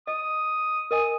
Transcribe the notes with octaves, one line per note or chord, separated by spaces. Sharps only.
D#5 D#6
A#4 D#5 G#5 D#6